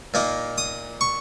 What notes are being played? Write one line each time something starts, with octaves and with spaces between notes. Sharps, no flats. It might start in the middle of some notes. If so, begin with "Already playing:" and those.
A#2 A#3 D#4
D#6
C#6